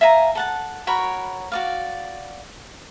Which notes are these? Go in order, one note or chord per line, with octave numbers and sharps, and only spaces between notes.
E5 F5 G#5 A#5
A4 F#5 A5
F#4 A#4 C#5 B5
F#4 D5 F5